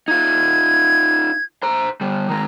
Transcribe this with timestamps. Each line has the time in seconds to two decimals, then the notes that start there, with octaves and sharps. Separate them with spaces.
0.08 D#4 F4 G#6
1.63 C5 A#5
2.01 D3 G3
2.29 D#3 G#3 A#5